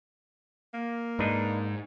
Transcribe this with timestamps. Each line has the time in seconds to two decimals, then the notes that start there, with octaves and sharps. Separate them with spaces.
0.74 A#3
1.19 G#2 D4 D#4 B4